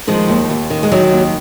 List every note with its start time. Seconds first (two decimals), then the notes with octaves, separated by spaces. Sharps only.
0.07 D#3 F3 G#3
0.28 D#2
0.50 D#2
0.70 D#3
0.83 G#3
0.91 D#3 F#3
1.12 D#2